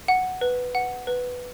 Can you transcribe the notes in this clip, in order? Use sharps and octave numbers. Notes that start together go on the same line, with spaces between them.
F#5
B4
F#5
B4